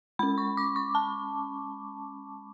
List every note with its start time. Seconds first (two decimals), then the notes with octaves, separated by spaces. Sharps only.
0.19 G#3 C#4 B5
0.38 C#6
0.57 D6
0.76 C#6
0.95 A5